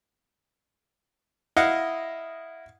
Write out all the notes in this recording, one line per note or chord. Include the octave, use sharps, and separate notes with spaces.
E4 D#5 F5 F#5